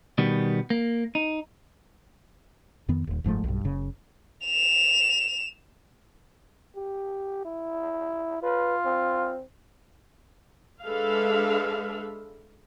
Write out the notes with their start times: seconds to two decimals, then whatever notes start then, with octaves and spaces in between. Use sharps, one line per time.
0.18 B2 D#3 G3 B3
0.70 A#3
1.15 D#4
2.89 F2 D#3 B3
3.07 D#1 D#2
3.24 F#1 G#2 F3 A3
3.44 B1 G2
3.64 F#1 C#3
4.44 E7 F7
6.76 G4
7.45 E4
8.43 F4 B4
8.86 C4
10.83 G#3 D4 A4 B4 E5 F5